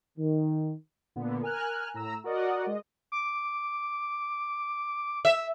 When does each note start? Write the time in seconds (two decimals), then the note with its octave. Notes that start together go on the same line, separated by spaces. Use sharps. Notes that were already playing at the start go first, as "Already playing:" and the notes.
0.18 D#3
1.16 A#2 D3 B3
1.42 A#4 G#5 F6 F#6
1.94 A2 A#5 E6
2.24 F#4 A#4 D5 D#5 F#5
2.66 G#3 D#5
3.12 D6
5.25 E5